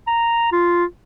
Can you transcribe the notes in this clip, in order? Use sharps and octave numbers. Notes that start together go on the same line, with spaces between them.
A#5
F4